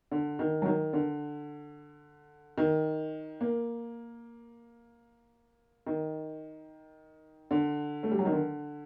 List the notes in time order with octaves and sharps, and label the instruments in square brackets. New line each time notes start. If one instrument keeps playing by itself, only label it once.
[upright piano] D3
D#3
F#3
D#3
D3
D#3
A#3
D#3
D3
A3
G3
F#3
D#3
D3